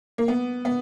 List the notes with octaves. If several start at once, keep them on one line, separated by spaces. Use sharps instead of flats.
A#3
B3
B3